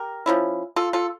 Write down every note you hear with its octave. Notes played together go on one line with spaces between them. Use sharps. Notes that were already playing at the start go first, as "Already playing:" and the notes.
Already playing: G4 A#4
F3 A#3 C#4 E4
F4 A4
F4 A4